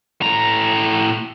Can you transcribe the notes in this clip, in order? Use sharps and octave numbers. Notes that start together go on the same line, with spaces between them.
A2 A#5